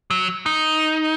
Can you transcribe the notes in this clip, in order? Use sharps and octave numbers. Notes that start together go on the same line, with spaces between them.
F#3
D#4